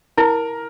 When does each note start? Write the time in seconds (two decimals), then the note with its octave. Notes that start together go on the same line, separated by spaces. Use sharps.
0.17 E4 A#4